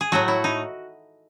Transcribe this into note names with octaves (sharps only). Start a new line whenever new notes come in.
G#4
A2 F#3 A3 F#4
E4
D#4